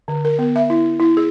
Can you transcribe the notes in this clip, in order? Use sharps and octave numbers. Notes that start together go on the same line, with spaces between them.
D3
A#4
B3
E5
E4
E4
G#4